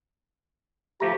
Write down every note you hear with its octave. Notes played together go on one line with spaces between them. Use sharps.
F3 A3 G4 A#5